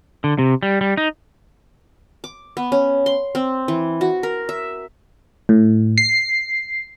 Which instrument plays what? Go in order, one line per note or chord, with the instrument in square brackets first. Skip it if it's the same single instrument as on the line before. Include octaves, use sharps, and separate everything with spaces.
[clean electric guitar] D3
C3
G3
G3
D#4
[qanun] D6
B3
C#4
C6
C4
E3
F#4
A#4
E5
[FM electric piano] A2
C7